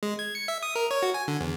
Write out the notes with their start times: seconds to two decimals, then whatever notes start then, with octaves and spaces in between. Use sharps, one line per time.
0.03 G#3
0.19 G#6
0.35 C#7
0.48 E5
0.63 D#6
0.76 A#4
0.91 C#5
1.03 F#4
1.14 G#5
1.28 D3
1.41 E2